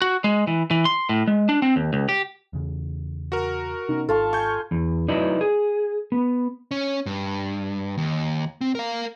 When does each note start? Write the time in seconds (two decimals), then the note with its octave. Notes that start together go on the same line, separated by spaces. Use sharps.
0.02 F#4
0.24 G#3
0.47 E3
0.71 E3
0.85 C6
1.09 A2
1.27 G#3
1.49 D4
1.62 C4
1.76 D#2
1.93 C#2
2.09 G4
2.53 E2 C#3
3.32 F#4 A#4
3.89 C3 B3 C#4 D#4
4.09 G#1 F4 A4 A5 C#6
4.33 G#5 C#6 G6
4.71 E2
5.08 F#3 D#4 E4 B4 D5
5.41 G#4
6.12 B3
6.71 C#4
7.06 G2
7.98 D#2
8.61 C4
8.75 A#4 F5